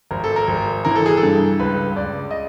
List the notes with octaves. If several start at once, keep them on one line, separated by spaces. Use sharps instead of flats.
G#1 A#4
A4
A#4
G#1
E3 A#4
A4
G#4
A4
G2
C#2 B4
C#2 D5
D#5